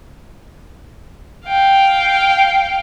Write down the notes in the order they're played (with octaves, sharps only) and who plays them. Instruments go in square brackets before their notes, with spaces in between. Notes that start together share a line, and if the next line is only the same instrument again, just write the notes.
[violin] F5 G5